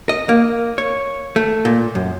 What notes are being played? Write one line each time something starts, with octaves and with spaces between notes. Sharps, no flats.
D#5
A#3
C#5
A3
A#2
F#2